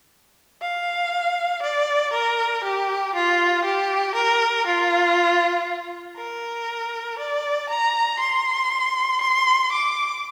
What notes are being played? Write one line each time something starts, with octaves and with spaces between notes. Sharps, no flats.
F5
D5
A#4
G4
F4
G4
A#4
F4
A#4
D5
A#5
C6
C6
D6